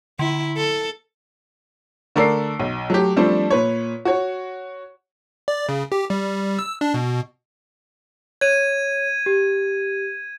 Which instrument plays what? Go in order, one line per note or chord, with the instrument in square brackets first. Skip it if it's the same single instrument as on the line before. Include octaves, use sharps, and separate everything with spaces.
[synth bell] D3 [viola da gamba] E4
[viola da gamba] A4
[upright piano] D3 A3 A#4 D5 E6 C7
B1
F#3 A3 G4
F3 G3 A3 C4 D4
A#2 B4 C#5
F#4 C#5
[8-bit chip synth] D5
C#3
G4
G3
E6
D4
B2
[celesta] C#5 [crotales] G#6 D#7
[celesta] G4